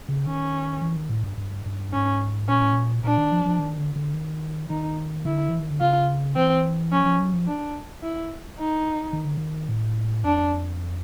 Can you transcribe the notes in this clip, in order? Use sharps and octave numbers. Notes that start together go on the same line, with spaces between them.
C#3
D#3 C#4
E3
D#3
A2
G2
G2
G2
G#2 C#4
A#2 C#4
A2
A#2
A#2 D4
D#3
F3
F3
D#3
D3
D3
D#3
D#3 D#4
D3 E4
E3
D#3
D3
C#3 F4
E3 C4
F3 C#4
F3
F#3
F3
D4
E4
D#4
D#3
D3
D#3
A2
F2 D4